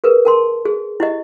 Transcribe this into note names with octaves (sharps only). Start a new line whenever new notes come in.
G#4 A#4 B4
A#4 A5 C6
G#4
E4 G4 D#5